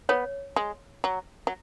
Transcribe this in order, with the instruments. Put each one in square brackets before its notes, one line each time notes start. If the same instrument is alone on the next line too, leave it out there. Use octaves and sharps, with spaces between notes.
[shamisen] B3 [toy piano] C#5
[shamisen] G#3
F#3
F#3